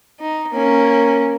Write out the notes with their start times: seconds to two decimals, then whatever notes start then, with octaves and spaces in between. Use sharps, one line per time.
0.20 D#4
0.52 A#3 C#4